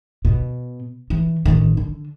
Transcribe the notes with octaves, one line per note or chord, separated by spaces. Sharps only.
B2
E3
A1 D#3
D3